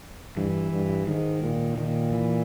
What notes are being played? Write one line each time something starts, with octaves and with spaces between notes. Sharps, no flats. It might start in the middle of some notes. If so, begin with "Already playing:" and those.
G2 E3
G2
G#2 D#3
A#2
A#2 D#3
E3